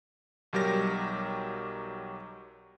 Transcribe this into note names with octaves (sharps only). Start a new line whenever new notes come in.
B1 F#3 G3 G4 A#4 A#6